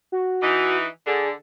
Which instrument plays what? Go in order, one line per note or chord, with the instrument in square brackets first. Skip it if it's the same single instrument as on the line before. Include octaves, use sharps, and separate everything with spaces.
[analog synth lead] F#4
[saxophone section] E3 D#4
[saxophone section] D3 [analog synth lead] G#4